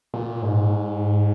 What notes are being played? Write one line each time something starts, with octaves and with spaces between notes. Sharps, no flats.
A#2
G#2